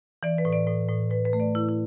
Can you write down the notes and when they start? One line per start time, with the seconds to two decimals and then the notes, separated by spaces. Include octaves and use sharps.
0.23 E3 D5
0.38 B4
0.45 A2
0.53 D5
0.67 A2
0.89 A2
1.11 A2 B4
1.25 B4
1.33 A3
1.40 D5
1.55 A2 E4
1.69 E4